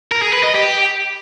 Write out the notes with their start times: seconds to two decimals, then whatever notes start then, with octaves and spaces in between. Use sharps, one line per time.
0.12 A#4
0.22 G#4
0.33 B4
0.44 D#5
0.54 G4